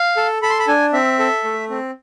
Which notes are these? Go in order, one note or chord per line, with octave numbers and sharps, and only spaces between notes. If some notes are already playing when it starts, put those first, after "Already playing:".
Already playing: F5
A4
A4 B5
C6
B5
D4 G#5
C4 E5
A4
A3
C4